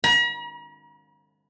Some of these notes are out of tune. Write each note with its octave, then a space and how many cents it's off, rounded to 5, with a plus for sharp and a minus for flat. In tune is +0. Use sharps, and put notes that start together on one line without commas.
A#5 +45